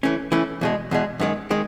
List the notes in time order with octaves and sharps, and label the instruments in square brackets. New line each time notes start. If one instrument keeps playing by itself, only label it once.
[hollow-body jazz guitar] E3 A3 C#4
E3 A3 C#4
E2 B2 G#3
E2 B2 G#3
F#2 D#3 G#3
D#3 G#3